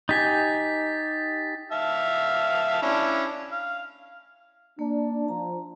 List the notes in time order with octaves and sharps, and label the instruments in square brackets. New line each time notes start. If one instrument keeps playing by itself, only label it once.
[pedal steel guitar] D#4 G4 G#5 [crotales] A6 B6
[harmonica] E5 F5 A5
C#4 D4 E4
F5
[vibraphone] A#3 [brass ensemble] D4
[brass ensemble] F3 [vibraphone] A#5